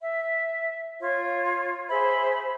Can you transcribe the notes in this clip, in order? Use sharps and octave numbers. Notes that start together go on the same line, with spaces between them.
E5
F4 C#5
G#4 C5 E5 B5